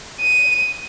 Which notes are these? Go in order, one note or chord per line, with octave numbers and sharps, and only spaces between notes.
D#7